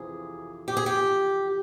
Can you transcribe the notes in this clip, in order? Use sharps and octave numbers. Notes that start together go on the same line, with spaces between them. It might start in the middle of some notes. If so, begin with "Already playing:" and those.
Already playing: F2 C3 E3 G#4
G4
G#4
G4